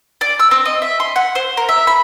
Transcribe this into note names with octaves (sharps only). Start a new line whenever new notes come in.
D5
E6
C4
D#5
E5
C6
F#5
C5
A#4
E5
B5